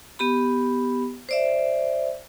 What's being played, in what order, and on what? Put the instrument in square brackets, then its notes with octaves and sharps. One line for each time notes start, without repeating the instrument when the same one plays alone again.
[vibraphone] B3 G4 B5
C5 D5 E5